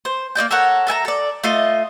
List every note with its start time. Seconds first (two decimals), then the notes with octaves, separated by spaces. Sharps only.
0.05 C5
0.35 A#3 D#4 D5 G6
0.51 A4 A#4 C#5 F#5
0.87 A4 E5 G#5 A#5
1.05 A4 D5
1.44 A3 F4 D#5